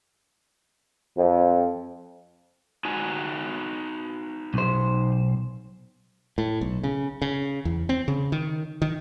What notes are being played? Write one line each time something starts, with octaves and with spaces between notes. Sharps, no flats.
F2
D#4 F#4 G#5
B1 C5
A2
B1
C#3
C#3
E2
C4
C#3
D#3
D#3